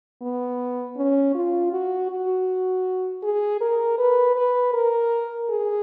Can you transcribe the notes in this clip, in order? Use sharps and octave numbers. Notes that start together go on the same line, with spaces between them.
B3
C#4
F4
F#4
F#4
G#4
A#4
B4
B4
A#4
G#4